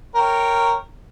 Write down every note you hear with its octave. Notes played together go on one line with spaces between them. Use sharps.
A#4 C#5 G5